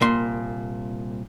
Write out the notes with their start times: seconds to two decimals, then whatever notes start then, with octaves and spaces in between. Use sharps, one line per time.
0.01 C2 A#2 C6